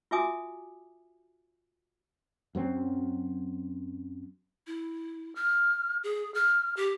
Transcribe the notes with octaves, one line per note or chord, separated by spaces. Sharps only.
F4 F#4 E5 G#5 D6 D#6
F#2 F#3 C4
E4
F6
G#4
F6
G4